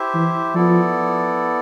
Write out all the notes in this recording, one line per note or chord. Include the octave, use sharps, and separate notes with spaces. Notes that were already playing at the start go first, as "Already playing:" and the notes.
Already playing: E4 G4 C5 E5
E3
F3 B3 E4 A4 D5